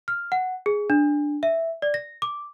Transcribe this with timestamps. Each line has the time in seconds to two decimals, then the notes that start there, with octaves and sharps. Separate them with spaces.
0.08 F6
0.32 F#5
0.66 G#4
0.90 D4
1.43 E5
1.82 D5
1.94 A#6
2.22 D6